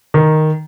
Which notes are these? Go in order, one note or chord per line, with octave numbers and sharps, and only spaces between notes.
D#3